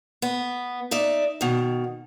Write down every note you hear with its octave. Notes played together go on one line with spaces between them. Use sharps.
B3
D#4 D5 E5
B2 D#3